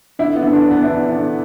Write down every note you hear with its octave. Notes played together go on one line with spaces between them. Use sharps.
D3 E4
B3
D3
D4
E2
B3
E4
E2 D4
D3